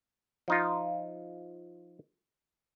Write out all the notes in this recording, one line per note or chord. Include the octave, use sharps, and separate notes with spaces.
F3 D#4 F4